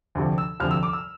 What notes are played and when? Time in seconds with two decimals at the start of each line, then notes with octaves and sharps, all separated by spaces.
0.15 D2 C3 F3
0.38 E6
0.60 D2 C3 F3 F6
0.71 E6
0.83 D6
0.93 E6